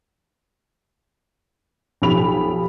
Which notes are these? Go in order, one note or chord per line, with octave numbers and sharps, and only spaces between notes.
B1 F3 G4 B5 F7